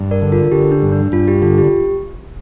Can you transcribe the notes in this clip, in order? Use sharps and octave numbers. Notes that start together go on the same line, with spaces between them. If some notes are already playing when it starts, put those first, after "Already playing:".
Already playing: G2
A#4 D5
D3
F4 A#4
D3 G4
D4
G2
D4
G2 F4
G4
D3 F4
G4